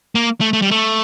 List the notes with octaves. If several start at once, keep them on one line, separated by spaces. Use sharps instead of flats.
A#3
A3
A3
G3
A3